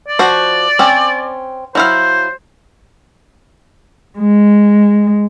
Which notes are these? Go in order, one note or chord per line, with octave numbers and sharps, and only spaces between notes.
D5
F3 F#4 C5
C4 C#4
F#3 E4 C5 F5
G#3